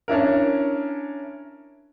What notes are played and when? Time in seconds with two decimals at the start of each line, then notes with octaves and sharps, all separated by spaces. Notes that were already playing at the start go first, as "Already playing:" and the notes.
0.08 C#4 D4 E4 A#4